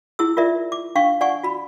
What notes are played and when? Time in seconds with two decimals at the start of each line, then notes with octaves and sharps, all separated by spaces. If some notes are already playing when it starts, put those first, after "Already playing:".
0.19 E4 G#4 E6
0.37 F4 A#4 D5 E5
0.72 D6
0.95 D4 F5 G5 C#6
1.21 D5 F#5 G#5 C#6
1.43 F#4 B5